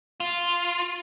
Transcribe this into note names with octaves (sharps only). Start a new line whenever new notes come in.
F4